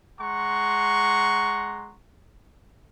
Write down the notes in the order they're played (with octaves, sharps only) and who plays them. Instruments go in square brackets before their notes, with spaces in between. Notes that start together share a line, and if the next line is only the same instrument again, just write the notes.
[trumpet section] G#3 F#5 A#5 C6 C#6